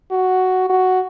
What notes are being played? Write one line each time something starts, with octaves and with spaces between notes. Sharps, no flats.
F#4
F#4